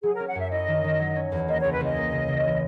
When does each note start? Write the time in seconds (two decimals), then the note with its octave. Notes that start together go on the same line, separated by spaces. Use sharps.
0.03 F#3 G#4
0.15 A#4
0.20 C#4
0.27 F#5
0.35 F#2 E5
0.51 E4 D#5
0.68 D#3
0.84 D#3
0.99 F#3
1.16 C#4
1.32 E2
1.48 A#3 D#5
1.60 C#5
1.64 C#2
1.72 B4
1.80 C#2 D#5
1.97 A#3
2.12 C#3
2.28 C#3
2.45 E3